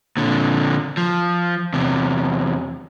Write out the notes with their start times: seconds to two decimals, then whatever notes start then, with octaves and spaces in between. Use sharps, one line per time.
0.17 A#2 D3
0.97 F3
1.73 E2 C3